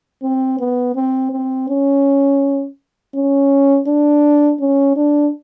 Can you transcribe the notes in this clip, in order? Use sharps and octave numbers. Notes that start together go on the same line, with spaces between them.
C4
B3
C4
C4
C#4
C#4
D4
C#4
D4